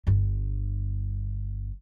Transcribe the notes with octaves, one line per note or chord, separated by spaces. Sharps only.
G1 G2